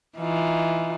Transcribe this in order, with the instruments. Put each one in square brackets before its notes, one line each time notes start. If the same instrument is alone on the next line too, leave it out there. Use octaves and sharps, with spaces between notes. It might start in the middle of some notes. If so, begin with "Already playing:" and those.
[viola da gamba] E3 D#4 F4